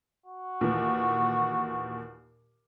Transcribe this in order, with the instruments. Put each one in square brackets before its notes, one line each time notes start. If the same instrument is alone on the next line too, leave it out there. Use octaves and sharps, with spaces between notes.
[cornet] F#4
[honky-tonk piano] D#2 A#2 E3